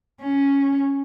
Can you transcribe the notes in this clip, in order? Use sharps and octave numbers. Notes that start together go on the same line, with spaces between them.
C#4